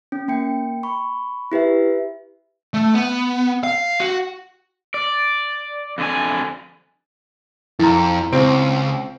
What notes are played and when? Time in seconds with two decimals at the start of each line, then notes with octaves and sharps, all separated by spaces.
0.12 C#4
0.28 A#3 G5 C#7
0.83 B5 C#6
1.52 E4 G4 B4 E5
2.74 A3
2.94 B3
3.63 F5
4.00 F#4
4.94 D5
5.98 F2 D3 D4 G#5
7.79 F2 E4 A#5
8.32 C#2 C4